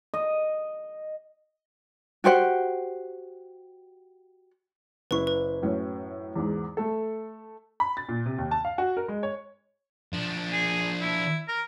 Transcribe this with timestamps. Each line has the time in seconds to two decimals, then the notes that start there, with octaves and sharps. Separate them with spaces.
0.14 D#5
2.24 F#4 G4 C5 F#5
5.11 F#1 E4 B4 C#6
5.27 B4
5.62 F#2 A2 C#4
6.36 E2 G#2
6.77 A3 A4
7.80 B5
7.97 A6
8.09 A#2
8.26 C3
8.38 D#2
8.51 A5
8.65 F5
8.78 F#4
8.97 A#4
9.08 G#3
9.23 C#5
10.14 F3 D4
10.52 G#4
11.01 E4
11.48 A#4